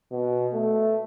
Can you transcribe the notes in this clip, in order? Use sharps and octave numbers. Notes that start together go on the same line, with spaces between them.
B2
A3